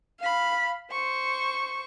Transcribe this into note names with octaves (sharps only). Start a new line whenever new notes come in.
F5 B5
C5 C#6